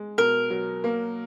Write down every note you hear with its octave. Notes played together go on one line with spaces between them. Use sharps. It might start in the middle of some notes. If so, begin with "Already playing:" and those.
Already playing: G#3
B2 A#4
F#3
A#3